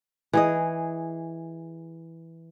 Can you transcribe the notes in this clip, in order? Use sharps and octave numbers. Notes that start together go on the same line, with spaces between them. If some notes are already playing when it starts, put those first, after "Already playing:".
E3 G#4 D#5